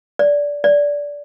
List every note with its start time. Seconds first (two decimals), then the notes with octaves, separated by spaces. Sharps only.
0.19 D5
0.64 D5